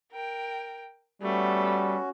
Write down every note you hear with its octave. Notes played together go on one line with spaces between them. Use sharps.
A#4 G5
G3 A3 B3 C#4 F#4